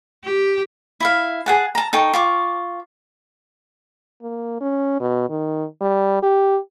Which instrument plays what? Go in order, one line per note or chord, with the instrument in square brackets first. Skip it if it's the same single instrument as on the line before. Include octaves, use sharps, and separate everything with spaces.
[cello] G4
[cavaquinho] E4 E5 F5
G#4 F#5 A5
A5 A#5
D#4 A4 G5 C#6
F4 C#6 D6
[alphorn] A#3
C#4
B2
D#3
G3
G4